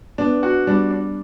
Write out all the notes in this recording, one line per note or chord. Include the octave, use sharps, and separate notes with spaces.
B3 D4
F#4
G3 D4
D4